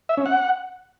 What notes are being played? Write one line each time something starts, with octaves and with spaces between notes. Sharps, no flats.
E5
C#4
F#5